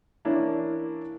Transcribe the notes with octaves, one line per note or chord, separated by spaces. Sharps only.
E3 A#3 C#4 D4 E4